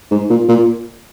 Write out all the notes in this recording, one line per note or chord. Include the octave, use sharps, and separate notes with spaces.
G#2
A#2
A#2